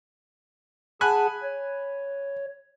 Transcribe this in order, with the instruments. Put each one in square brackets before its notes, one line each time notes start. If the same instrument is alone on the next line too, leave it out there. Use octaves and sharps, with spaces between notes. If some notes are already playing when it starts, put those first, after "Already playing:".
[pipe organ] G#4 F#5 A5 [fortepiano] G#5 B5 F#6
[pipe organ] C#5